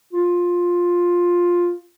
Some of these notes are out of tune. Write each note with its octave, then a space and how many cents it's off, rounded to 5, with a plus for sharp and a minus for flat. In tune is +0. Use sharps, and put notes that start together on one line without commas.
F4 +10